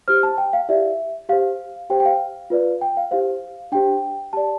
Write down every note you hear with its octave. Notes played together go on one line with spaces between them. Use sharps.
E4 G4 C5 F6
A5
G5
F5
E4 G4 D5 E5
G4 C5 F5
G4 C5 G5
G5
F5
F4 B4 D5
G5
F5
E4 G4 C5 F5
D4 G4 C5 G5
G4 D5 A5